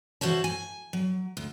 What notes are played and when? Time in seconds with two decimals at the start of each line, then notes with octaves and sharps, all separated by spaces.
0.21 E3 F3 F#4 C5 C#5 A5
0.44 G#5
0.93 F#3
1.37 D2